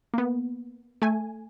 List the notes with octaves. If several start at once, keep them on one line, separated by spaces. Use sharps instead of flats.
A#3 B3
A3 G#5